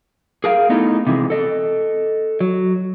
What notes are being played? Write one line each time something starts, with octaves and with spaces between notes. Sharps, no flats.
G#4 A#4 F5
A3 B3 D#4 E4
C3 E3 G#3
A4 D#5
F#3